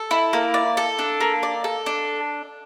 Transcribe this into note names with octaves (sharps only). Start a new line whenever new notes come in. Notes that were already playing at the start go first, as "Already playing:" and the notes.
Already playing: A4
E4
A#3
D5
A4
D4
A#3
D5
A4
D4